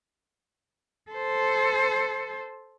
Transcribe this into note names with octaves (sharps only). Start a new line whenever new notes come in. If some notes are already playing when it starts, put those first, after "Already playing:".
A4 C5